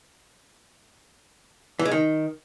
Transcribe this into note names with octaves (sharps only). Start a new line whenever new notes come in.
E3
G#3
D#3